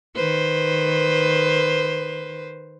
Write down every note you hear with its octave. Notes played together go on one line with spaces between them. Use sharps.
D#3 B4 C5